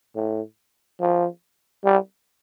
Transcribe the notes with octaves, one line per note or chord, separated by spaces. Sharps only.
A2
F3
G3